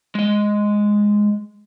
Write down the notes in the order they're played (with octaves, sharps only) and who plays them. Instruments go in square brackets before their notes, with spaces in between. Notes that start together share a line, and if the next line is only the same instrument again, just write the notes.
[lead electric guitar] G#3 D#5